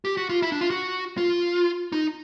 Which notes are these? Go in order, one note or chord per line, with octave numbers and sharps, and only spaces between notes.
G4
F#4
F4
E4
D4
F4
F#4
F4
D#4